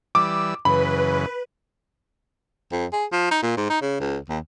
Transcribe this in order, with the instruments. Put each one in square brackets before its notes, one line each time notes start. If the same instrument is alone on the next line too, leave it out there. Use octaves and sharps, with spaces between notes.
[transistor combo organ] E3 G3 E6 [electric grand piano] D6
[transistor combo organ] F#2 C#3 E3 [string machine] B4 [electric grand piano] B5
[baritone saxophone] F2
G#4
F3
D#4
A#2
G#2
D#4
C#3
C#2
D#2